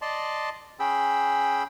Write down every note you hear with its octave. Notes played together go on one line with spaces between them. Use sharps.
D5 D#5 A5 C6
C#4 G#4 G5 B5 E6